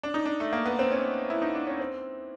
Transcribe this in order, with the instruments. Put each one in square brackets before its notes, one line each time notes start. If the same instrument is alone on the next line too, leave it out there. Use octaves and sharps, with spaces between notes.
[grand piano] D4
D#4
D4
A3
A#3
B3
C4
C#4
E4
D#4
D4
C#4
C4